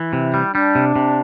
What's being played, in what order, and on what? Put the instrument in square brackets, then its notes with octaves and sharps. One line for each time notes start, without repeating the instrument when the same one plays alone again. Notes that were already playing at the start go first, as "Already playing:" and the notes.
Already playing: [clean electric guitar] E3 [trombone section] E4
[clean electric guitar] C3
G3
[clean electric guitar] G3 [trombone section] D4
[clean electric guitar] C3
C3